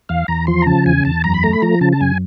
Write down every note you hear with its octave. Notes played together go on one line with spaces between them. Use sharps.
E2 F5
E2 A#5
F3 C6
A#5
C#3 A5
E2 G#5
E2 A5
F#2 A#5
B5
A3 A#5
B5
F3 A#5
C#3 A5
A5
F#2 G#5